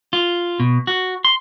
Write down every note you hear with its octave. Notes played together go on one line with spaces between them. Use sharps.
F4
B2
F#4
C6